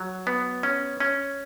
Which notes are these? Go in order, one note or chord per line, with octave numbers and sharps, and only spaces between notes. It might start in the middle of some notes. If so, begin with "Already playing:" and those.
Already playing: F#3
B3
C#4
C#4